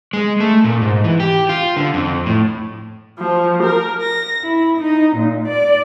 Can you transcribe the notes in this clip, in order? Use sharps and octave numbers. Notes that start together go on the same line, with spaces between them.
G#3
A3
A#2
G#2
E3
G4
F4
D3
F2
A2
F3
A#4
A#6
E4
D#4
A#2
D5